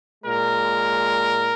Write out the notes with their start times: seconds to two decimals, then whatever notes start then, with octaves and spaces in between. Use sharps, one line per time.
0.24 A#2 G#3 A#4